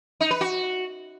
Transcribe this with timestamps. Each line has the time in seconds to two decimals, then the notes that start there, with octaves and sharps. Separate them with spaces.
0.20 D#4
0.31 B4
0.41 F#4